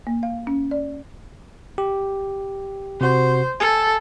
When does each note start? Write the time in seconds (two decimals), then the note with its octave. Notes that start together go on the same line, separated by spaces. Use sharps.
0.07 A#3
0.23 F5
0.47 C#4
0.71 D5
1.78 G4
3.01 C3 F#4 C5
3.60 A4 G#5